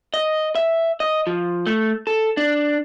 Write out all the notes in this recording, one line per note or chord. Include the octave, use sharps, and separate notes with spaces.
D#5
E5
D#5
F3
A3
A4
D4